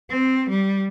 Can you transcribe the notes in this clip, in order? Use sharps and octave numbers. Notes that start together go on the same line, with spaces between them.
C4
G3